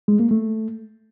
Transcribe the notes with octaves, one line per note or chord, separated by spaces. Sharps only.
G#3
A#3
A3